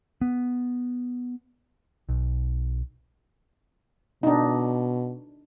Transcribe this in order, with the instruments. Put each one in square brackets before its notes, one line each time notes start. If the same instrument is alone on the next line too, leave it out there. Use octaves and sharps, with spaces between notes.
[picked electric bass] B3
B1
[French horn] B2 [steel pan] D4 D#4